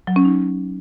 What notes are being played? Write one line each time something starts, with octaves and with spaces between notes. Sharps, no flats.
F#3
C#4
D#4